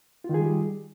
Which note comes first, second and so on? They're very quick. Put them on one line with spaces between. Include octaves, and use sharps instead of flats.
F4 D#3 G#4 G3 G4